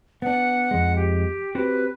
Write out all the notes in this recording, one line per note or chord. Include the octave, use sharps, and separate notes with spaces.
B3 D4 F#5
F2 G#3
G4
C4 F#4 G4 B4